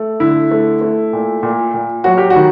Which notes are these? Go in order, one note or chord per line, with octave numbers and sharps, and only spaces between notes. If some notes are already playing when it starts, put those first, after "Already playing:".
Already playing: A3
D3 E4
A3
A3
A#2
A#2
A#2
F#3 F#4
G4
F#4
D#3